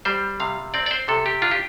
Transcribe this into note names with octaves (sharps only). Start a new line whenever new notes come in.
G3 C5
C3 F5
C4 D5
D5
C5
C3 A4
G4
D4 F4
G4